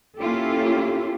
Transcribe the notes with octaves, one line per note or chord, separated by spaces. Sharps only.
A#3 C#4 E4 F4 G4 A4